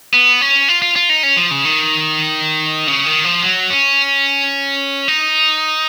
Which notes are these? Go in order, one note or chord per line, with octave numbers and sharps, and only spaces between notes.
B3
C#4
F4
F4
F4
D#4
C#4
F3
C#3
D#3
C#3
D#3
F3
F#3
C#4
D#4